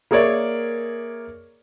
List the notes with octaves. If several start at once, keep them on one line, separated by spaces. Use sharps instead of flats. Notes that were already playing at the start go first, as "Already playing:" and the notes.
A#3 G#4 A#4 C#5 D5 E5